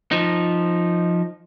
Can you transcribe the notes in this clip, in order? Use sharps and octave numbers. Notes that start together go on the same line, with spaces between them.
F3 D#4